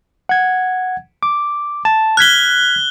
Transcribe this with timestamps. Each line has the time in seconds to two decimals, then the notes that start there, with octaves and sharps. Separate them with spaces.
0.29 F#5 G#6
1.23 D6
1.85 A5
2.17 F6 F#6 G#6 B6 G7